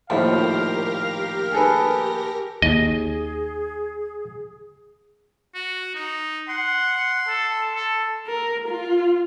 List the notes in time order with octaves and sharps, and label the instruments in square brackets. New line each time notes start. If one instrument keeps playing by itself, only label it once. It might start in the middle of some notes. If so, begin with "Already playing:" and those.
[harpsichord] A#1 D#2 A2 [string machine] G4 A#4 A#6 [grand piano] C5 [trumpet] F5
[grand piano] G#4 A4 B4
[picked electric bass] D#2 [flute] G#4 [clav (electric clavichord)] D#5
[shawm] F#4
D#4
[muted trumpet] F#5 [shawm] C6
[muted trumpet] A4
A4
[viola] A#4
F4